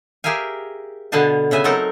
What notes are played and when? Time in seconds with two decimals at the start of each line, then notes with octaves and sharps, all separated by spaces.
0.24 G4 G#4 A#4 E5 F5 G#5
1.12 B2 D3 B3 F5 G#5 A5
1.51 C#3 B3 E5 G#5
1.64 F#3 C4 D#4 A4 A#4